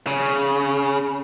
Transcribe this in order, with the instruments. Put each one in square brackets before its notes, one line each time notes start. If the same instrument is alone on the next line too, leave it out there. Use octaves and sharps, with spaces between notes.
[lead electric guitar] C#3